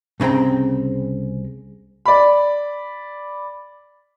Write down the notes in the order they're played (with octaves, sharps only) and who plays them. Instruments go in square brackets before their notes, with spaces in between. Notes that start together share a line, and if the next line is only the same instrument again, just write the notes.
[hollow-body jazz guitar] C2 C#3 C4 G5 A#5
[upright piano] D5 B5